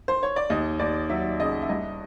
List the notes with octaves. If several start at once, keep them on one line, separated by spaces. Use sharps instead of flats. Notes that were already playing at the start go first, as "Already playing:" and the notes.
C5
C#5
D5
D#2 D#5
D#2 D5
F#3 E5
C#3 D#5
E5
G2 D#5